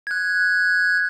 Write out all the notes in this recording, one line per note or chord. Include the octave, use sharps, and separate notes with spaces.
F#6 G#6